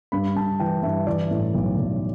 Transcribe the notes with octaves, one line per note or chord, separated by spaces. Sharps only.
G2 B5
G2 A5
E3 G5
G2 E5
E3 D5
A2
B1
B1